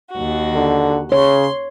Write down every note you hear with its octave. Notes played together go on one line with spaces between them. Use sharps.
D#2 F#4
D3
C#3 C#5 C6